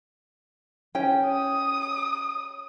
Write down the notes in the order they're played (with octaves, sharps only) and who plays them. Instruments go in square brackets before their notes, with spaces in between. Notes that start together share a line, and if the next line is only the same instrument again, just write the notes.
[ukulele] C#4 G5
[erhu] D#6